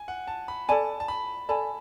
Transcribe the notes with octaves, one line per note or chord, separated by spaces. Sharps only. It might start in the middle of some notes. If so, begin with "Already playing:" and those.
Already playing: G#5
F#5
A5
B5
A4 D5 G#5 A5 B5
A5
B5
A4 D5 G#5 A5 B5